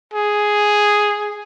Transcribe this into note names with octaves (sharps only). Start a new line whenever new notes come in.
G#4